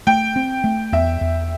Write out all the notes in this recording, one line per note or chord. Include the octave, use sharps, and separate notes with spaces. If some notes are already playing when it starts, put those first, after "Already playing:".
A3 G5
C4
A3
E2 E5
E2